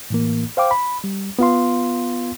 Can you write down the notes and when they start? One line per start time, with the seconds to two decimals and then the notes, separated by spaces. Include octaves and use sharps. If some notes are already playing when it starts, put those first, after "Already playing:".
0.10 A2 E3 A#3
0.57 C5 F5 G5 D6
0.71 B5
1.04 G3
1.39 B3 F4 F5 C6